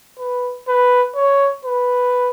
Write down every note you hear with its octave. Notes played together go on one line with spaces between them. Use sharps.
B4
B4
C#5
B4